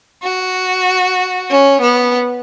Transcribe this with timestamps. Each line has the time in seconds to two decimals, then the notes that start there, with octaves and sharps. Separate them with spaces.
0.23 F#4
1.49 C#4
1.81 B3